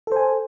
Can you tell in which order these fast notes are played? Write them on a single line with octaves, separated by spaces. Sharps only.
A4 C5 G#5